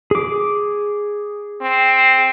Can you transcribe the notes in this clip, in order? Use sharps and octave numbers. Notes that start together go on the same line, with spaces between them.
G#4 D6
C4